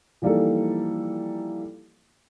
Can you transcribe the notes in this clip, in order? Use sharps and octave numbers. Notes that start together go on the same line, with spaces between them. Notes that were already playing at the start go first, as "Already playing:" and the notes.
E3 F3 G3 A#3 D#4 A4